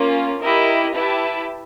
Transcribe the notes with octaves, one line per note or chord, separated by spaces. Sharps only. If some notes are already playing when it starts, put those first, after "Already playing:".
Already playing: A#3 C#4 F4
E4 G4 A#4 D#5
E4 G4 B4 E5 A5